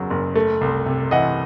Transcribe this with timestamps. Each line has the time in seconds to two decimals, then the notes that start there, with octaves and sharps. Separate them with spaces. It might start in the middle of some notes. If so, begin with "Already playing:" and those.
Already playing: F#1 E2 C#3 F#3
0.10 F#1
0.35 A3
0.61 C2
0.86 C3
1.11 E3 D#5 F#5